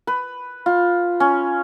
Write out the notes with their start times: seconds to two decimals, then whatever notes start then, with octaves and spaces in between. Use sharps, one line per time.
0.07 B4
0.66 F4
1.20 C#4